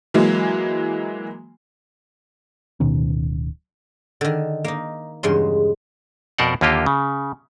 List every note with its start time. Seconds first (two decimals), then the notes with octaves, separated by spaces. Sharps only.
0.14 E3 F#3 G#3 A#3
2.80 D1 B2 D#3 C#4
4.21 D3 D#3
4.64 A#3 D#4
5.23 E2 G2 C#3 G#3 C6
6.38 F2 B2 A#4 C5 D5 F#5
6.61 D#2 D3 A#3 F4 G4 D#5
6.86 C#3